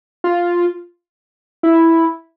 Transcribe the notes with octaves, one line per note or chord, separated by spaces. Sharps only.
F4
E4